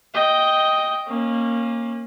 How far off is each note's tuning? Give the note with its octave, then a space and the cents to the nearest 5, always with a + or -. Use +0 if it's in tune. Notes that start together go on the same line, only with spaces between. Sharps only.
D#5 +5 G5 +0
A#3 +0 C#4 -25